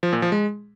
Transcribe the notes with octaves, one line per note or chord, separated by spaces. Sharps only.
F3
A#2
F3
G#3